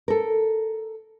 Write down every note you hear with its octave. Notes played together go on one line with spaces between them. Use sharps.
A4 A#4